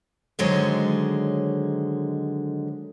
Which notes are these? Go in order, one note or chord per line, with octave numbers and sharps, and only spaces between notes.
D3 D#3 F#3 G#3 C5 C#5